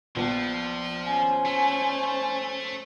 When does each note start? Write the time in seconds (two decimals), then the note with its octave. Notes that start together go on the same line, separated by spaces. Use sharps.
0.16 A#1 F3 B3
1.06 C#4 C5 G#5
1.45 A3